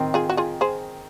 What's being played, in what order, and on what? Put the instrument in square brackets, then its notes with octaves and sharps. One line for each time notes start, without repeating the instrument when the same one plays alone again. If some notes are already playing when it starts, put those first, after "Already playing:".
Already playing: [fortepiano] D#3 C4
[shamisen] F4 G#4
F#4
F4 G#4
G#4 C5